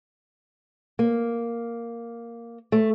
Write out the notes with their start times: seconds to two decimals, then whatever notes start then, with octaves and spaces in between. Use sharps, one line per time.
0.99 A#3
2.72 A3